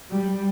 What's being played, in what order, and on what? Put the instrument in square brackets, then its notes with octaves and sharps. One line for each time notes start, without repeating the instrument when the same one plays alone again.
[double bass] G3